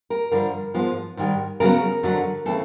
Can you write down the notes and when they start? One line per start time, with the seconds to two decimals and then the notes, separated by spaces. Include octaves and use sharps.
0.10 A#4
0.31 G2 D3 F3 A#4
0.74 G#2 F3 G#3 B3
1.17 G#2 D#3 G3
1.60 C#3 F#3 B3 A#4
2.03 F2 D3 F#3
2.45 C#3 E3 A3 C4 A4